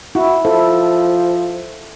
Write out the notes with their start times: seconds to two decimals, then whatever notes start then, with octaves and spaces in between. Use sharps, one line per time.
0.15 E4 F#4
0.45 F3 E4 A4